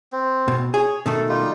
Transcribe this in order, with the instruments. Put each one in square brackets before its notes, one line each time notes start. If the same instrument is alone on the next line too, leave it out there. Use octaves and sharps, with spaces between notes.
[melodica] C4
[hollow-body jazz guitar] B2
[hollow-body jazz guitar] G#4 [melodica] C#5
[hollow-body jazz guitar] B2 D#3 A3 [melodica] A4
[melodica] G3 D#4 F4